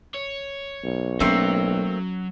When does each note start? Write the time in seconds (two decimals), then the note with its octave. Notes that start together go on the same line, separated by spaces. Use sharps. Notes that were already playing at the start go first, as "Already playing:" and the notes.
0.14 C#5
0.84 B1
1.20 F#3 A3 A#3 C4 C#4